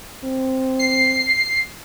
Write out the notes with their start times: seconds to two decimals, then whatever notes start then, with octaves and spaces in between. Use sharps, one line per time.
0.24 C4
0.79 C7